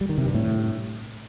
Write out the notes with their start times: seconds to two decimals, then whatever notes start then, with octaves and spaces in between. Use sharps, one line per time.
0.01 G3
0.09 D#3
0.18 C3
0.26 G2
0.34 A2